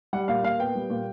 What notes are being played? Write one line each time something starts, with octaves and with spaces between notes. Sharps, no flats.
G3 F#5
A#2 F5
A#2 F5
B3 G5
G3
A#2